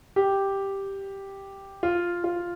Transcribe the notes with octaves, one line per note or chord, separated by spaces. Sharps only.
G4
F4
F4